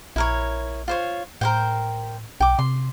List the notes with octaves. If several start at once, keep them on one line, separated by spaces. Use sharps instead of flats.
A#1 E4 A#4 C#5
F4 C5 C#5
A2 A#4 C5 G5
B1 G5 D6
C3 C6